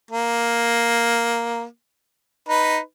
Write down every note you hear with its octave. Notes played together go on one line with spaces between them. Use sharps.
A#3
D#4 B4